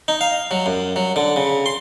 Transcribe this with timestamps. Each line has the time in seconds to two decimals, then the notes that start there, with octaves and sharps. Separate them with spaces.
0.08 D#4
0.21 F5
0.51 F#3
0.66 F#2
0.96 F#3
1.16 D3
1.36 C#3
1.66 C6